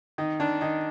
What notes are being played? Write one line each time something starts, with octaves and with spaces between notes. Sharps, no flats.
D#3 D#4
D#3 D4
D#3 D#4